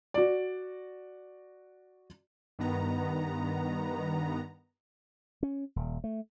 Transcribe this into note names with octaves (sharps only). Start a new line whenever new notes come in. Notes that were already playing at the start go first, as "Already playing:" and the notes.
F#4 D5
G2 D#3 B3 A#5
C#4
D#1
A3